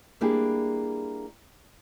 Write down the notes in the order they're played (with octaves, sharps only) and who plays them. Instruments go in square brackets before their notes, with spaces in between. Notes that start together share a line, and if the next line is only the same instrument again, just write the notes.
[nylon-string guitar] G3 A#3 D4 E4 G4 G#4